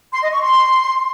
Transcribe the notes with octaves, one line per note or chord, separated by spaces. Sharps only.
C6
D#5
C#6
C6